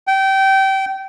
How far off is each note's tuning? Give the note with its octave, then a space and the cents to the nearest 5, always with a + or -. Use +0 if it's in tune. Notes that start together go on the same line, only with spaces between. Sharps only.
G5 -25